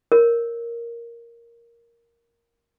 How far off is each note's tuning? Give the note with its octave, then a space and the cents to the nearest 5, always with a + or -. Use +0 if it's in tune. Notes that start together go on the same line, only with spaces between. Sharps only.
A#4 +0 C#5 +0